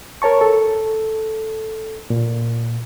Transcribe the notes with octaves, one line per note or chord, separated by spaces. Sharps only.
A#4 C#5 A5 C#6
A4
A#2